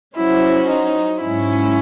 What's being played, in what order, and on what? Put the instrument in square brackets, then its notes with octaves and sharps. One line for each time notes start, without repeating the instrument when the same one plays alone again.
[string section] F#3 C#4 F#4 C5 [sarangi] E4
[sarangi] D#4
[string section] G#2 F#3 C#4 [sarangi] E4